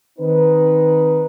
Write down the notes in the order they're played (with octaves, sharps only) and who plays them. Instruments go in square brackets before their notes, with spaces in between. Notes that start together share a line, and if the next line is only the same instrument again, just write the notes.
[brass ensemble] D#3 C4 D#4 B4